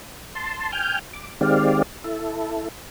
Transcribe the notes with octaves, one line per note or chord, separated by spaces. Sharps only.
A5 C6
G5 G#5 F6 G6
D6
D#3 G#3 C4 G4 D5 F5
E4 A4